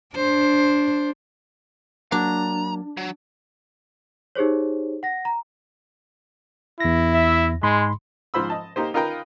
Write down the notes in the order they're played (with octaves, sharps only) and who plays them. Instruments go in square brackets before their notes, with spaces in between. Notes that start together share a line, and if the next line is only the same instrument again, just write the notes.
[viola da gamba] D4 [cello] C5
[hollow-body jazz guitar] F#3 A#3 [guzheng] D4 [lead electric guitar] A#5
[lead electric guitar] F#3
[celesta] D#4 G4 G#4 C5 C#5
F#5 A#6
A#5
[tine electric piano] E2 A#6 [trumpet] E4
[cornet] E5
[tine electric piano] G#2 B5 C6 [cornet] G#3
[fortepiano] G#2 F3 C5 B5 E6
D#5 A5
A#3 D#4 G4 C5
D#4 F4 A#4 B4 G5 A#5